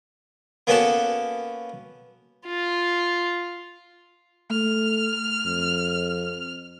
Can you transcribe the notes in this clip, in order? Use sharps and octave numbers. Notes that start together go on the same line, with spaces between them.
A#3 B3 C#4 F#4 A4 A5
F4
A3 F6
F2